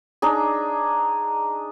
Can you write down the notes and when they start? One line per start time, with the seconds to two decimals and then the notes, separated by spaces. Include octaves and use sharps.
0.22 D4 D#4 G#4